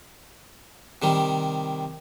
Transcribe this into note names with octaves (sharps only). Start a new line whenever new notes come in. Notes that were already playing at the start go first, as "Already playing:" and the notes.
C3 D#3 G3